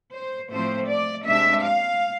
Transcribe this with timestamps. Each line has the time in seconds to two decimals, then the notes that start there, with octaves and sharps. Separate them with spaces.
0.11 C5
0.50 A2 F3 A3 C4 C5
0.88 D5
1.27 C3 G#3 D4 E5
1.65 F5